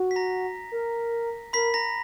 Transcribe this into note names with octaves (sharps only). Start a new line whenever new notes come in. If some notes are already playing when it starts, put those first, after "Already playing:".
Already playing: F#4
B6
A#5 A#6
A#4
A#4 B5 B6
A#5 A#6